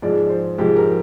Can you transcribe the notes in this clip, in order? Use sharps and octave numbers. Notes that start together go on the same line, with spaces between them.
G#2 F3 G#3 D5
C5
G#2 F3 G#3 G4
A#4